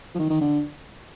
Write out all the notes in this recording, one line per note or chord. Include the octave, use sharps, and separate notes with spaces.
F3
D#3
D#3
D3